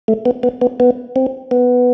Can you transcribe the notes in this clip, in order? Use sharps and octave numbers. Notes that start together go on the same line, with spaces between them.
A3
B3
B3
B3
B3
C4
B3